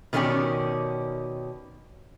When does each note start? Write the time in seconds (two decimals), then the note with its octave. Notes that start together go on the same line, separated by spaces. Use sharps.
0.13 B2 D#3 G3 C#4 G4 D5